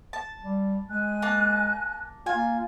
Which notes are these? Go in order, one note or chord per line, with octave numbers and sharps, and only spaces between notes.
A5
G3
G#3 G#5 F#6
A#3 A5
A#3 F4 G#5